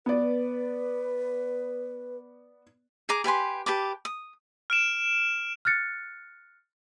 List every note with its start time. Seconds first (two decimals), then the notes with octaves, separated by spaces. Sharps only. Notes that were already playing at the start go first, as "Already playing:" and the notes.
0.06 B3 B4 D5
3.09 G#4 G#5 A#5 D6
3.24 G4 B4 G#5 C6
3.66 G4 B4 A5 D6
4.05 D#6
4.70 F6 D7 E7
5.65 F6 F#6 A6 C#7